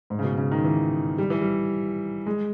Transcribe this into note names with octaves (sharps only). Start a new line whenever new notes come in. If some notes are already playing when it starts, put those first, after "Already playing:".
G#2
C#3
B2
C#3
D#3
E3
G3
E3
G3
G#3